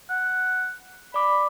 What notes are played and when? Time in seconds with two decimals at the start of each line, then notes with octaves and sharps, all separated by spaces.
0.10 F#5
1.14 D5 B5 D6